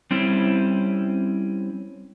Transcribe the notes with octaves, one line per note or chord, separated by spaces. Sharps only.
G3 C4 C#4 E4